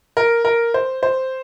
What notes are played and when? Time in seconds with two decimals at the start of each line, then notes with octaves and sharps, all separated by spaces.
0.17 A#4
0.45 A#4
0.74 C5
1.03 C5